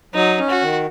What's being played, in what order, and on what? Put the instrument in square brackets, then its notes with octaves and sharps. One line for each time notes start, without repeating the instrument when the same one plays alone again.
[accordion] F#3 [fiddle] D#4
[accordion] C#4
[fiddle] F#4
[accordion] D#3